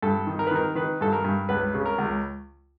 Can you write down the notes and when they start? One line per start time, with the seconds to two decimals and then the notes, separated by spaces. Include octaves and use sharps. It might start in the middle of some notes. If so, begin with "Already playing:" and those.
0.02 G2 A4
0.27 D#3
0.39 A#4
0.47 B4
0.51 D#3 A#4
0.75 D#3 B4
1.01 G2 A4
1.13 A#4
1.24 G2
1.49 C#2 B4
1.74 C#3
1.86 A#4
1.98 C#2